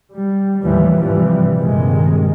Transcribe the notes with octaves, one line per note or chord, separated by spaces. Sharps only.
G3
D#2 A2 E3 F3 G3
G#1 G2 C3 E3 F3 G3
A#1 G2 C3 D#3 G#3